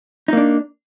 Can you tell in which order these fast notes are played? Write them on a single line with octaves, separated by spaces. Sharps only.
D#4 A#3 D4